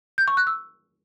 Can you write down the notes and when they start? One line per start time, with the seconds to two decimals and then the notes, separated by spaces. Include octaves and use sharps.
0.18 G6
0.28 C#6
0.37 F#6
0.47 E6